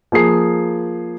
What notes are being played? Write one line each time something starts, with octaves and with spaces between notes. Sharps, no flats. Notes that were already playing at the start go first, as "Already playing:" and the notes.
F3 A#3 G#4 C7